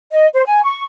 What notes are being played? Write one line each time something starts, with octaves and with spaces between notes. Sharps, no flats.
D#5
C5
G#5
C#6